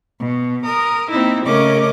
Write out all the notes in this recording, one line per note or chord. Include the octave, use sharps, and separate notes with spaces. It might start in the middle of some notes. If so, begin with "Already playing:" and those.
B2
A#4 D#6
A#3 C4 D#4 E4
C#3 A3 C#4 A#4 D#5 D6